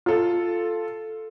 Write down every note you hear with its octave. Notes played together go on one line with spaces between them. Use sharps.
F4 A4